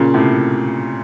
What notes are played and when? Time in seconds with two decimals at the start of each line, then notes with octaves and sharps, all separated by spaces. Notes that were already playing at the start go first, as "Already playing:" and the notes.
Already playing: A#2 C#3
0.14 A2 C3